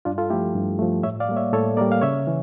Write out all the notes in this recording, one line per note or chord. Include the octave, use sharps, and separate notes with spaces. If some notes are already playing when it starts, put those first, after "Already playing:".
G2 D4 F4
F4 A4
F3 A3 E4 G4
G2
F3 A3
A2 C#5 E5
D5 F5
G3 A#3
C#5 E5
A2 A4 C#5
G3 A#3 A#4 D5
F5
C#3 C#5 E5
E3